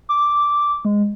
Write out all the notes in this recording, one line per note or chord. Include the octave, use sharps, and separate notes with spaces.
D6
G#3